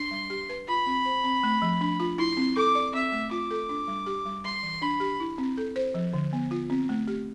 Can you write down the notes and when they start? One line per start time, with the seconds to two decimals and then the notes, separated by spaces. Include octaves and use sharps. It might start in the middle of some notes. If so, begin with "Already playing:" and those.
Already playing: D4 C6
0.11 G3
0.30 G4
0.49 B4
0.68 F4 B5
0.86 C4
1.05 C5
1.24 C4
1.44 A3
1.62 F3
1.81 D4
2.00 F4
2.18 E4 C6
2.37 C4
2.57 A4 D6
2.75 D5
2.94 C4 E5
3.12 A3
3.31 F4 D6
3.51 A4
3.69 D4
3.88 G3
4.06 G4
4.25 G3
4.44 G3 C6
4.63 E3
4.82 D4 B5
5.00 G4
5.20 E4
5.38 C4
5.57 A4
5.76 C5
5.94 F3
6.14 D3
6.33 B3
6.51 F4
6.70 C4
6.89 A3
7.07 G4